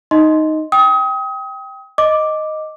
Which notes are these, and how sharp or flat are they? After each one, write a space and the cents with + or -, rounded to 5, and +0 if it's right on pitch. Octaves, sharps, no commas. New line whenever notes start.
D#4 +0 D#5 +10 C6 +0
G5 +0 D#6 +30
D#5 +0 D6 +0